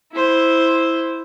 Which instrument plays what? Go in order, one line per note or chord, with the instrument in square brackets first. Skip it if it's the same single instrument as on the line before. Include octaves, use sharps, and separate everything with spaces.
[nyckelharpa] E4 C5